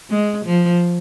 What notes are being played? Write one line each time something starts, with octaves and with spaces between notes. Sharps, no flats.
G#3
F3